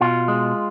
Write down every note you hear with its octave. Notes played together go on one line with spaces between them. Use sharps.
B2 F4
G#3